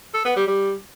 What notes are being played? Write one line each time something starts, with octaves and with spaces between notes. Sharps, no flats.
A4
B3
G3
G3